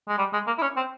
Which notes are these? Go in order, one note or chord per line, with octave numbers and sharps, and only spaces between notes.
G#3
G3
G#3
A#3
E4
C#4
C4